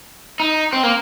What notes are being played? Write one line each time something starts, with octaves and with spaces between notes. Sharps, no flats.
D#4
C4
A#3